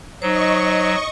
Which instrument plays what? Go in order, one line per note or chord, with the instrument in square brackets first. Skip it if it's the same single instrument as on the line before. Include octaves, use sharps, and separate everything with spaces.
[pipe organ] F#3 [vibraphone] D#4 C5 [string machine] D#5 C#6